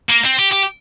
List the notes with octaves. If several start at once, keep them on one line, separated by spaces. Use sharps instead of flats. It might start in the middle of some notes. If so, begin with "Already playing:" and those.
A#3
C4
G4
G4